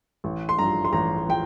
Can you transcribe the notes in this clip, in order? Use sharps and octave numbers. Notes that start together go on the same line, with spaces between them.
A1
C6
G2 F3 A#5
C6
A1 A#5
F3 G5